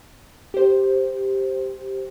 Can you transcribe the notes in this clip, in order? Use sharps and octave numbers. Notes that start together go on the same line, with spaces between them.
G4 C5